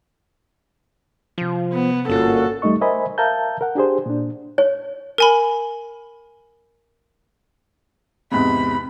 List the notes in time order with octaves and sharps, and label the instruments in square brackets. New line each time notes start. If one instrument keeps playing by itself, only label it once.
[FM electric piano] C3 F4 [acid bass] F3
[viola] B3
[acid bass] G1 [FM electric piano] G#2 F4 [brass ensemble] A#3 C#4 F#4 [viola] A4
[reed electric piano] E2 G3 A3 D#4 D#5 C#6
A#4 C5 D#5 E5 G#5 B5
A#4 E5 F5 A5 A#5 G6
A#4 F#5
D4 G4 G#4 C5
A#2 D4
[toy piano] C#5
[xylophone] A#4 G#5 B5
[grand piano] E2 G#2 C3 [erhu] B5